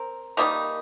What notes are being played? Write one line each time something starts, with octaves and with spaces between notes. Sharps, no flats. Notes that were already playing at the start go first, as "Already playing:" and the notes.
Already playing: C4 A#4
D#3 G3 A#3 D#4